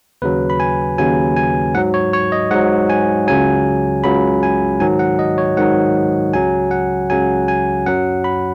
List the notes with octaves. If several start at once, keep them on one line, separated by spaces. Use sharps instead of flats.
D#2 C#3 F#3 B4
B5
G#5
D#2 C#3 F#3 G#5
G#5
G#2 F#3 F#5
C#5
C#5
D#5
G#2 F#3 F#5
G#5
C#2 C#3 F#3 G#5
C#2 C#3 F#3 B5
G#5
G#2 D#3 F#3 G#5
F#5
D#5
C#5
G#2 D#3 F#3 F#5
C#2 C#3 F#3 G#5
F#5
C#2 C#3 F#3 G#5
G#5
F#2 F#3 F#5
B5